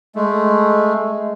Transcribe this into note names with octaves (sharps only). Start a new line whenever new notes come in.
G#3 A3